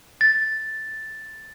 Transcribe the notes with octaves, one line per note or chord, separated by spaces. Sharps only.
A6